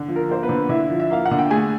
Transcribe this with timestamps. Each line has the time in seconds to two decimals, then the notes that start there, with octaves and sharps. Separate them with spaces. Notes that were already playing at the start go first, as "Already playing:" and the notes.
Already playing: D3
0.08 F3
0.16 A#4
0.29 A#3 C5
0.43 B3 B4
0.49 D3
0.69 D3 E4 E5
0.90 F3
1.00 E5
1.10 A#3 F5
1.26 F#5
1.31 D3
1.39 G5
1.51 A3 G#4 G#5